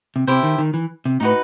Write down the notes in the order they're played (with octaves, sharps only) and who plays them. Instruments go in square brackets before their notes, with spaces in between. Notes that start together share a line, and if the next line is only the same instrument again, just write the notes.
[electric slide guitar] C3
[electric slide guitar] C3 [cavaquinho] E4 G4 C5 E5
[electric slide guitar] D#3
D#3
E3
C3
[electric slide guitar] A2 [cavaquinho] D#4 F#4 B4